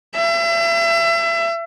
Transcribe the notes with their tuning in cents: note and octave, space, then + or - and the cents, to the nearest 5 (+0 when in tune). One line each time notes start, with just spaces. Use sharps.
E5 +35